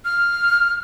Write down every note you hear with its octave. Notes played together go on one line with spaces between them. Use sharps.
F6